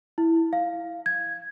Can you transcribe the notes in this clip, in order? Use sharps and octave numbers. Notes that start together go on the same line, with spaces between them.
E4
F5
G#6